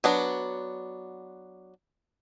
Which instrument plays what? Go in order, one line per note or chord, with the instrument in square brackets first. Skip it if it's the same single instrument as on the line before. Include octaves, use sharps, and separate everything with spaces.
[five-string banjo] F#3 B3 D4